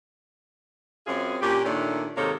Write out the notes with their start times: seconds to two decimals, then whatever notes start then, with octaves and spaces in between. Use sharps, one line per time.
1.07 F#2 C4 C#4 F4 G#4
1.42 A#2 C#4 D4 G4
1.64 A#2 D#3 A3 C#4 D4
2.17 G#2 C3 D#3 A#3 A4 C#5